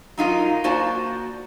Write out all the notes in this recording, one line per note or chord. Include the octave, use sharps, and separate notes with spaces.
F#3 D#4 F4 A#4
A#3 F#4 C5 D5 A5